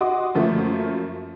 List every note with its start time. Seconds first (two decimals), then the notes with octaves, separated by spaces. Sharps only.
0.01 F#4 D#5 C6 D6 D#6
0.35 F#2 F3 A3 A#3